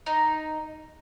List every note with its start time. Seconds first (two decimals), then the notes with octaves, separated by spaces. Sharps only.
0.06 D#4